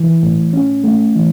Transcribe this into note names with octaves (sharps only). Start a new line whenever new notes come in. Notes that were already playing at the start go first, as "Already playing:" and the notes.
Already playing: E3
A2
C#4
A3
E3